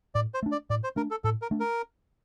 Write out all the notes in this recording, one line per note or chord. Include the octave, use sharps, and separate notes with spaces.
A2 D5
C5
A3 D4
D5
A2 D5
C5
A3 D4 A#4
A4
A2 A4
A#4
A3 D4
A#4